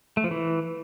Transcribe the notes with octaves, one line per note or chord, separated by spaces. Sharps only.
A3
F3
E3